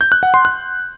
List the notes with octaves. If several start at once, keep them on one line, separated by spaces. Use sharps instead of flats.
G6
F#6
F#5
C6
F#6